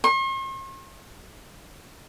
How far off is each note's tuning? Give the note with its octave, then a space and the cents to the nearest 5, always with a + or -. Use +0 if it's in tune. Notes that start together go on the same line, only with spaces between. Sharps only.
C6 +45